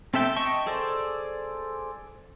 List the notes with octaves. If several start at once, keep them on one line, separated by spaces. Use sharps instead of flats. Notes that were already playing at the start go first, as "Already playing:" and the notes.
C4 A4 E5 G5 A5
D#5 G5 A5 C#6
G#4 A4 C5 D5